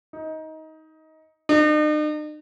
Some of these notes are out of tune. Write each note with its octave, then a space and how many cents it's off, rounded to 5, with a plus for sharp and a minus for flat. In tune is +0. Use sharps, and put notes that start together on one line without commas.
D#4 +20
D#4 -45